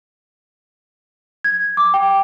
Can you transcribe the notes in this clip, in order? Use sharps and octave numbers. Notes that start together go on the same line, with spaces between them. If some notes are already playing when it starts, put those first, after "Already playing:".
G#6
D6
G5